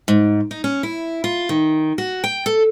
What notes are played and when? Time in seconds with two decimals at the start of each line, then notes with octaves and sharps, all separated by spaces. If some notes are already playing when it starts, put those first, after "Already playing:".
0.08 G#2
0.51 D#4
0.64 C#4
0.83 E4
1.24 F4
1.49 D#3
1.98 F#4
2.24 G5
2.46 A4